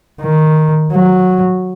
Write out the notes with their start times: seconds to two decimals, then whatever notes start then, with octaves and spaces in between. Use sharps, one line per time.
0.21 D#3
0.92 F#3